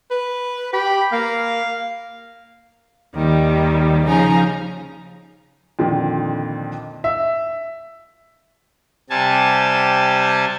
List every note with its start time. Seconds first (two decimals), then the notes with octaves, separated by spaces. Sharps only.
0.11 B4
0.73 G4 B5
1.12 A#3 F5
3.15 D#2 D#3 G3
4.07 C#3 F3 D#4 G#5 A#5
5.79 F2 A#2 D3 D#3
7.04 E5
9.10 C3 G3 G#5 A5